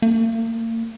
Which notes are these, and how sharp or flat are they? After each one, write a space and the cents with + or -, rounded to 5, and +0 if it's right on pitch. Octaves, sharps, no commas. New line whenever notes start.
A#3 -40